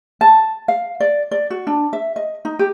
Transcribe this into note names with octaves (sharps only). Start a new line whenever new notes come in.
A5
F5
D5
D5
F#4
D4
E5
D#5
D#4
G4